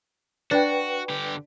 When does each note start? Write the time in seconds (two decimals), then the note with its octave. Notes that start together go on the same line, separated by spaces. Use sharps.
0.51 D4 F#4 B4 G5
1.10 D3 G4